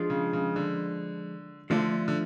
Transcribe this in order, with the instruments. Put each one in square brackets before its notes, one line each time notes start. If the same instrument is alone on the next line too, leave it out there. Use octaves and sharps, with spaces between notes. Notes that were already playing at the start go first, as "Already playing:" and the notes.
Already playing: [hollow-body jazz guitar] F3 G#3 D4 F4
[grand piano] C#3
C#3
D3
[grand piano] D3 [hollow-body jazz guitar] F3 A3 D4 F4
[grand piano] D3